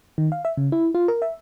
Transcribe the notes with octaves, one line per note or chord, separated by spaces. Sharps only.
D#3
F5
E5
C#3
E4
F4
A#4
E5